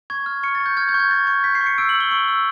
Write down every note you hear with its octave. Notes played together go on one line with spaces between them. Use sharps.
C#6 G#6
F6
C#6 C#7
A6
C#6
G6
F6 G#6
G6
C#6
G#6
C#6 A6
C#6
G6 B6
C7
C#6
C#7
E6 D7
F#7
E6
G7
C#6
E6